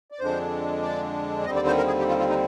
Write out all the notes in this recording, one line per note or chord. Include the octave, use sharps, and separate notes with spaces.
D5
F2 D3 G#3 D4 C5
D5
D#2 D3 G3 C4 D#5
D5
C5
A#4
G#4
G4
F4
F4
D#4